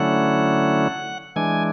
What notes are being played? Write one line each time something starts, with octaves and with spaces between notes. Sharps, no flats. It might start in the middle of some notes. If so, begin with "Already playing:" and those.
Already playing: D3 F#3 A3 C#4 E4 F#5
E3 G#3 D4 G#5